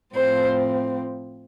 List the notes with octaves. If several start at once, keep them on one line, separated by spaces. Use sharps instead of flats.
A2 F3 C4 C5